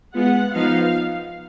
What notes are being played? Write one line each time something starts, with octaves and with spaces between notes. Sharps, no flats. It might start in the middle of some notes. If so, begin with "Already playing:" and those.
G#3 B3 F4 F#5
F3 B3 D#4 F5